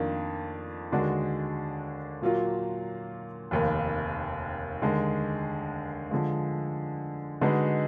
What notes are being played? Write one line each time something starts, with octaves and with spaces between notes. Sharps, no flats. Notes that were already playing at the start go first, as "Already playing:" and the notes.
Already playing: F2 D#3 A#3 D4
D#2 D3 G#3 D4 F#4
A#2 F#3 A#3 F4
F1 D#2 D#3 A#3
D#2 D3 G#3
D3 F3 G#3
D3 G#3 D#4 F#4 B4